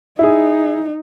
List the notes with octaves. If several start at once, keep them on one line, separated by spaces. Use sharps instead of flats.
D#4 E4 G#4